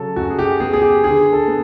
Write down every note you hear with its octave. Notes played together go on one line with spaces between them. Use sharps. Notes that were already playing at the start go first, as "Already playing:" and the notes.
Already playing: C#3 F#3 A4
F#2 F#4
G#4
G4
B3 G#4
G#4
G4
D3 G#4
A4
B3